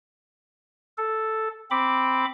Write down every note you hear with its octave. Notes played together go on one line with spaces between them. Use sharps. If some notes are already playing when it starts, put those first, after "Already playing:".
A4
C4 B5 D6